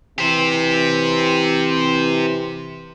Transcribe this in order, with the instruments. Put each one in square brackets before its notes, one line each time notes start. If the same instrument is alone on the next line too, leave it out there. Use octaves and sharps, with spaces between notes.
[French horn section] C3 E3 [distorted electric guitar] G4 C5